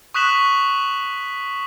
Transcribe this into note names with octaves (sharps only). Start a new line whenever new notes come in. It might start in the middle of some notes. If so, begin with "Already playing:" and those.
C#6 D#6 F#6 B6 E7 F#7